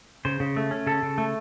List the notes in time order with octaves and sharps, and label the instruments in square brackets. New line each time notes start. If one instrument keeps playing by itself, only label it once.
[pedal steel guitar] C#3 C5
C#3
A3
C#4
C#3 A4
C#3
A3